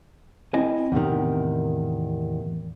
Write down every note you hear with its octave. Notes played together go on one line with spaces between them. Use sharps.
C4 E4 D#5 G#5
E2 A2 C3 D#3